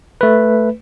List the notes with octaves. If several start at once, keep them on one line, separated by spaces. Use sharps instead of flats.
A3 B4